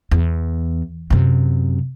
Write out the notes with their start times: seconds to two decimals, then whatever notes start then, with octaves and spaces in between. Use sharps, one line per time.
0.11 E2
1.10 F#2 C3